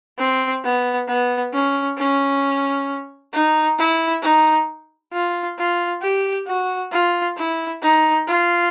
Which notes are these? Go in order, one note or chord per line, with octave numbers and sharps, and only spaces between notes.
C4
B3
B3
C#4
C#4
D#4
E4
D#4
F4
F4
G4
F#4
F4
E4
D#4
F4